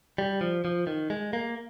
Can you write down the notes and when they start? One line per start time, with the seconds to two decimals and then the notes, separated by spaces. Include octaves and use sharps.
0.18 G3
0.41 F3
0.65 F3
0.87 D#3
1.10 G#3
1.33 A#3